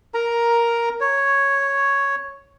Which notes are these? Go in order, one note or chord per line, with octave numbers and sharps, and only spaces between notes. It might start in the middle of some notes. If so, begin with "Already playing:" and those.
A#4 A#5
C#5